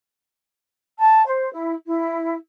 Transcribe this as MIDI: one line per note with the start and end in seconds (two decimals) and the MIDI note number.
0.98 1.24 81
1.26 1.50 72
1.51 1.74 64
1.85 2.33 64